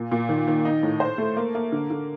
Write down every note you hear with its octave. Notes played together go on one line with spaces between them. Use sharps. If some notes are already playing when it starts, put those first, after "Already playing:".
Already playing: A#2
A#2
D#3
D#3
D#4
A2
C5
A3
A#3
A#3
D3
D3